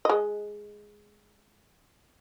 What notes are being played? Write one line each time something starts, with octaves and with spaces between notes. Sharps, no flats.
G#3 D#5